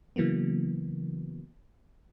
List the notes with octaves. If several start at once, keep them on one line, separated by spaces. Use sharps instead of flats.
C#3 E3 F#3 A#3 B3